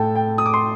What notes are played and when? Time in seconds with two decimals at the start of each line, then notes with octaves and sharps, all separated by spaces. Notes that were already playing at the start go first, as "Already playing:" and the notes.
Already playing: A2 A3 A4 G5 A5
0.16 G5
0.38 D#6
0.46 D6
0.54 C6